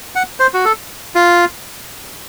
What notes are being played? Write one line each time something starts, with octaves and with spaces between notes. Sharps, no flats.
F#5
C5
F#4
A4
F4